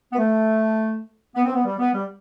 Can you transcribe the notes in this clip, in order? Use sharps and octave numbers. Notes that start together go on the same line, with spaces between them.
B3
A3
B3
C4
B3
G3
B3
G3